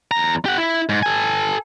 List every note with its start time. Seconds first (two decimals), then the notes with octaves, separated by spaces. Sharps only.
0.11 E2 A#5
0.45 G4 F#5
0.58 E4
0.89 G#2
1.03 A4 G#5